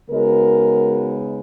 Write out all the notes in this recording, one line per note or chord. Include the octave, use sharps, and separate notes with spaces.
C#3 G#3 B3 D#4 F#4 A#4